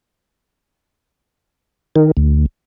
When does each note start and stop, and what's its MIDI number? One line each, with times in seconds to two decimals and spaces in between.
1.96 2.11 51
2.17 2.46 38